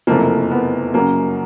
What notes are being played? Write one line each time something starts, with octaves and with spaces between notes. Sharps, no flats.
F#1 F2 C3 F3 A3 A#3
B3
F#2 C#3 F#3 A#3